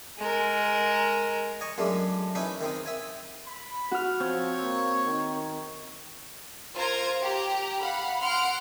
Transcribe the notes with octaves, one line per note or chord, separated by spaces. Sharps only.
G#3 A#4
D#5 G#5 C#6
F#2 G#3 A3 D4
C#4 D#4 E4 B4
D#3 C4 D#4
E5 G#5
B5
F#4 F6
F3 C4 C#5
A#3
D#3
F4 A#4 C5 A#5 G#6
G4 A#5
F5 F#5 B5
F#5 C6 F6 D7